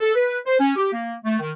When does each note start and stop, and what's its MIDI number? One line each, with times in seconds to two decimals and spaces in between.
0.01 0.12 69
0.15 0.37 71
0.46 0.57 72
0.60 0.72 61
0.76 0.90 67
0.92 1.14 58
1.24 1.36 57
1.39 1.51 51